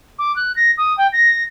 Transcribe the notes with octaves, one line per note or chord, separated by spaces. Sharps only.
D6
F#6
A#6
D#6
G5
A#6